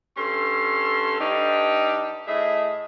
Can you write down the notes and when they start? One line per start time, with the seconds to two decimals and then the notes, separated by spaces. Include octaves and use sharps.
0.17 G2 C#4 A4 C6
1.20 G2 D4 D#4 G4
2.27 A2 G#4 D#5 E5